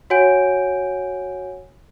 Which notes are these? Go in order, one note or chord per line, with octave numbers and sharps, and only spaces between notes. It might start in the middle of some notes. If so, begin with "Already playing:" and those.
F#4 C#5 F#5 G#5 G6 D7